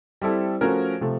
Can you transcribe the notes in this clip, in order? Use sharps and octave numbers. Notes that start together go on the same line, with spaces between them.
G3 C4 E4 A4
F3 A3 C#4 F#4 A#4
C3 F3 A3